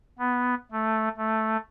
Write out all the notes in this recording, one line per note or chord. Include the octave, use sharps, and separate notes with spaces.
B3
A3
A3